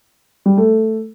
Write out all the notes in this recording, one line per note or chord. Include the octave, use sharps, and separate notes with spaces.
G3
A3